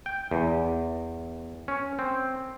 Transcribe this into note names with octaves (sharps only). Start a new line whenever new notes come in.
G5
E2
C#4
C4